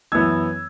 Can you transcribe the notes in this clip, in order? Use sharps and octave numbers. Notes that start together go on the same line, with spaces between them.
F#2 E3 B3 E6 G#6